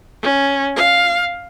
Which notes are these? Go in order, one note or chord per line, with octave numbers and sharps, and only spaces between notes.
C#4
F5